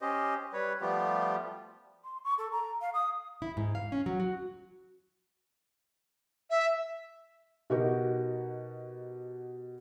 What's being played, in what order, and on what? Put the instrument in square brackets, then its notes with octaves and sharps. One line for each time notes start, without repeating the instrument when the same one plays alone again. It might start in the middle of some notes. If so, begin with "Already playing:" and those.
[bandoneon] C#4 G4 C5 D#5
G3 B4 C#5
F3 G3 A3 B3 F4 G4
[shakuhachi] C6
C#6
A4
A#5
F5
D#6
[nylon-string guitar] E4
G#2
F5
C#4
F#3
F#4
[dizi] E5
[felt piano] B2 D#4 F#4 G4 A#4